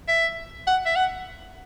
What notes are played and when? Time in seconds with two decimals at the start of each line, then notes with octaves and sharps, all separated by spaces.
0.08 E5
0.67 F#5
0.86 E5
0.96 F#5